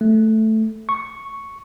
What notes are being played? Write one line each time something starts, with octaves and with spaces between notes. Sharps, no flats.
A3
C#6